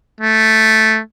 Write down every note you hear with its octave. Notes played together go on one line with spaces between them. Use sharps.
A3